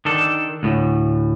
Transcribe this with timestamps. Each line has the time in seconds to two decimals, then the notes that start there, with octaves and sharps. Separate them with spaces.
0.05 D#3 D4 A4
0.63 D2 A2